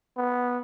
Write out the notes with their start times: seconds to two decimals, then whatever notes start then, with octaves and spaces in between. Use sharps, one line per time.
0.17 B3